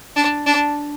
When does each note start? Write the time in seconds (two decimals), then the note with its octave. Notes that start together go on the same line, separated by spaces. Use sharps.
0.16 D4
0.46 D4